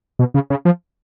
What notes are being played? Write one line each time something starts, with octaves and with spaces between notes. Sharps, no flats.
B2
C#3
C#3
F3